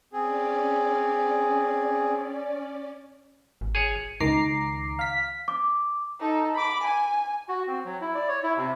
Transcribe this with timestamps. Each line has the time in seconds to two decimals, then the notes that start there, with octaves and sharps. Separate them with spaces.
0.13 C4 C#4 G#4 D5
3.61 G#1
3.75 G#4 C#5
4.20 C#2 D#3 A#5 D6 C7
4.99 F5 B6
5.48 D6
6.20 D#4 A4
6.54 B5 D6
6.84 G#5
7.49 F#4
7.68 C4
7.85 F#3
8.01 E4
8.14 D5
8.28 C#5
8.43 E4
8.57 C3